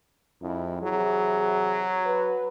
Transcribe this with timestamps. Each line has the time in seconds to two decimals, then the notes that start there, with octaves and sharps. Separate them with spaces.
0.42 F2 F3 G#3 E4
0.82 C3 E3 F#3 G#4
2.06 B4